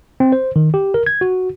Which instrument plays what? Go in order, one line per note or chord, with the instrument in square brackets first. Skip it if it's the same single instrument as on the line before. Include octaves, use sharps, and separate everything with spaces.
[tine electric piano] C4
C5
D#3
G4
A#4
G#6
F#4